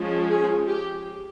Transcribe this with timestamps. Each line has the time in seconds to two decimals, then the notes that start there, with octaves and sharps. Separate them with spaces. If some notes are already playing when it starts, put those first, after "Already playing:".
Already playing: F3 G#3 C#4
0.29 G#4
0.67 G4